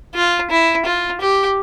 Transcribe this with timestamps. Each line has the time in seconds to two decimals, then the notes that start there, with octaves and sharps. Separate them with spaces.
0.15 F4
0.50 E4
0.85 F4
1.21 G4